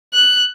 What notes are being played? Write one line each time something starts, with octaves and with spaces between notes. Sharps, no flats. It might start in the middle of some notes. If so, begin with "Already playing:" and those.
F#6